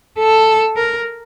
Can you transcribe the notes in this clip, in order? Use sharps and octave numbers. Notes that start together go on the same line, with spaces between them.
A4
A#4